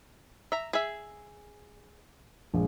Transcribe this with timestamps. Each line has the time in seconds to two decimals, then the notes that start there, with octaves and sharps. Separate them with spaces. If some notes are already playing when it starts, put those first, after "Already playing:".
0.52 E5 A#5
0.73 G#4 E5
2.54 A#1 G#3